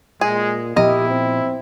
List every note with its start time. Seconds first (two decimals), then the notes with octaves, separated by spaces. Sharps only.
0.21 A#2 G#3 G#4
0.76 A#2 F3 B3 E4 G4 A#4 D#5
1.08 C4